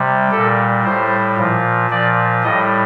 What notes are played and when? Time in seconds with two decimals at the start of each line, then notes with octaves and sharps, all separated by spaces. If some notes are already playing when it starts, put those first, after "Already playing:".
Already playing: C3 G3
0.31 A#2 G3 A4
0.84 A2 G3 C5
1.37 A#2 F3
1.90 A#2 F3 D5
2.43 A2 G3 D#5